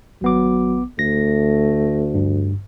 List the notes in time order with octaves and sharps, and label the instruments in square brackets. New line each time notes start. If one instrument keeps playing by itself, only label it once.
[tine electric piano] G#1 B3 D6 [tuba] F#3
[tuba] D2 [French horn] A3 [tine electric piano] A#6
[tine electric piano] G2